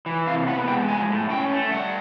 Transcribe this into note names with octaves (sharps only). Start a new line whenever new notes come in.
E3
C3 F5
B3 F#5
G#3 G5
F3 G#5
A2
C#4 G5
A3
G3 F#5